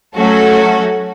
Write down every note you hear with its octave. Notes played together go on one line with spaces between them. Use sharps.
F#3 A3 C#4 F#4 A4